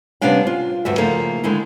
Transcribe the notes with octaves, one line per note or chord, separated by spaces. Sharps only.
C3 G3 B3 C#4 D4 F5
F4
D2 G2 F#4 E5
C#3 F3 A3 A#3 D#4
D3 D#3 G#3 E4